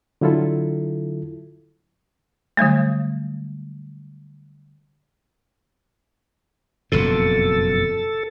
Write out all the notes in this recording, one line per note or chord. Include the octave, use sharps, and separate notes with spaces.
D3 F#3 E4 F4 A4
D3 F#3 G3 A3
F#1 F2 B2 A4